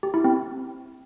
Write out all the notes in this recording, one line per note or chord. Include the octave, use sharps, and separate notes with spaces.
G4
E4
C4